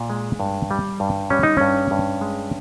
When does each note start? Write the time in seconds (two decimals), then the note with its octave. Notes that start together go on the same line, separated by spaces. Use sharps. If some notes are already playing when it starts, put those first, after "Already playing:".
Already playing: A#2
0.10 G#3
0.40 G2
0.71 G3
1.00 G2
1.30 G3 C#4
1.43 D#4
1.57 G2 C#4
1.91 G2
2.21 G#3